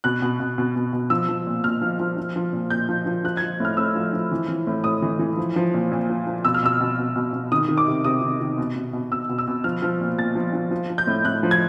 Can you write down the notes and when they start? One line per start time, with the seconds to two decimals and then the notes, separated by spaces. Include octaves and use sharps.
0.04 B2 F#6
0.22 B2
0.40 B2
0.58 B2
0.76 B2
0.93 B2
1.10 F3 E6
1.29 F3
1.47 A#2
1.64 A#2 F6
1.82 F3
2.00 F3
2.17 F3
2.36 F3
2.53 A#2
2.70 A#2 G6
2.89 F3
3.06 F3
3.24 F3 F#6
3.37 G#6
3.42 F3
3.60 A2 F6
3.77 A2 E6
3.95 F3
4.13 F3
4.32 E3
4.49 E3
4.67 A2
4.84 A2 D#6
5.02 E3
5.19 E3
5.37 F3
5.56 F3
5.74 A#2
5.92 A#2
6.10 F3
6.27 F3
6.45 B2 E6
6.54 F6
6.63 B2 E6
6.81 B2
6.98 B2
7.16 B2
7.33 B2
7.52 D#3 D#6
7.68 D#3
7.78 D6
7.87 C3
8.04 C3 D#6
8.22 D#3
8.41 D#3
8.58 B2
8.76 B2
8.93 B2
9.11 B2 E6
9.29 B2
9.38 E6
9.48 B2
9.64 F3 F6
9.82 F3
10.01 A#2
10.18 A#2 A6
10.35 F3
10.53 F3
10.71 F3
10.90 F3
10.98 G6
11.07 A2
11.25 A2 F#6
11.43 F3
11.51 G#6